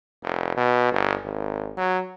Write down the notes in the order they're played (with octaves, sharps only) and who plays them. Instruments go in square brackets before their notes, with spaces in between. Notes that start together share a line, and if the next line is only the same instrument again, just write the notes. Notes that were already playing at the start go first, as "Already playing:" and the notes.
[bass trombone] F1
B2
G1
G#1
F#3